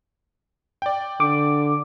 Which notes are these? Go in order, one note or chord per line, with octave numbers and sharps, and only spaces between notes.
D5 G5
D3 D6